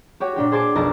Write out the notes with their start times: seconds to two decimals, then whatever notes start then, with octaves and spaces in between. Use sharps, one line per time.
0.20 F#4 G4 C#5
0.36 A#2 D4 G4
0.52 G#4 C5 G#5 A5 D6
0.75 B1 F2 A#4 D#5 A5 A#6